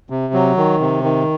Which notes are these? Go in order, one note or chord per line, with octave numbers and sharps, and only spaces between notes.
C3
F#3
D#3
C3
D#3